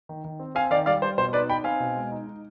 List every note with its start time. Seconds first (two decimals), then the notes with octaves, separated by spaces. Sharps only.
0.09 D#3
0.24 D#3
0.40 C4
0.55 C4 F5 G#5
0.70 D#3 D5 F5
0.86 G3 D5 F5
1.02 G3 C5
1.18 B2 C5
1.33 D#4 B4 D5
1.49 D#4 G5 B5
1.64 C4 F5 G#5
1.80 B2
1.96 G#3
2.12 D#4
2.27 D#4